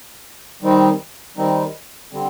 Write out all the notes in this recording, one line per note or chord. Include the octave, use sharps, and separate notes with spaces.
D#3 G3 C4 D#4
D#3 G3 C4 D#4
D3 G3 C4